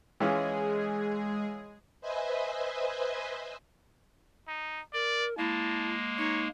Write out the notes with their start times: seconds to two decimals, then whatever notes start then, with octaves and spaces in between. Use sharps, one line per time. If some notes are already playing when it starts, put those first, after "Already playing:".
0.20 E3 G#3 C#4 F4 G#4
2.01 B4 C5 D#5 E5 G#5
4.47 D#4
4.94 A#4 D5
5.38 G#3 A#3 E4 A5
6.18 D#4 C#5